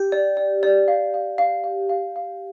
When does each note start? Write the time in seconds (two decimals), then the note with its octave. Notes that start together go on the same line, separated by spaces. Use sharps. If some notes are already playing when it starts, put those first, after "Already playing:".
Already playing: G4
0.12 D5
0.37 D5
0.63 D5
0.88 F5
1.14 F5
1.38 F5
1.64 F5
1.89 F5
2.16 F5